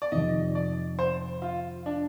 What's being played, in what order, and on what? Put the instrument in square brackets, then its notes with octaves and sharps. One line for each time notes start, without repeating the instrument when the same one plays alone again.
[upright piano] D5
[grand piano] F2 C3 D#3 [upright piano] D#5
[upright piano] D5
C5
F4
D4